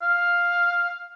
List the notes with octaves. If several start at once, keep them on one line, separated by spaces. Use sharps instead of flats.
F5